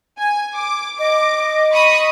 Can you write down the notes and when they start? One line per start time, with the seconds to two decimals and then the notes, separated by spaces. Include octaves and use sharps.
0.18 G#5
0.54 D6
0.99 D#5 D6
1.70 B5 C#6 D#6